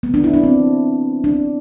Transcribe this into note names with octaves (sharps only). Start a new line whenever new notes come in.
B3
D4
E4
D4
C4
D4